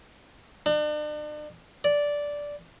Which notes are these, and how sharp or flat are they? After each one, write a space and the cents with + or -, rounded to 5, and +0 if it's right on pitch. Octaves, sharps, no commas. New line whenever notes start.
D4 +40
D5 -10